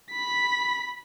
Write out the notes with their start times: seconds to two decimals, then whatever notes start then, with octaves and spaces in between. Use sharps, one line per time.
0.12 B5 B6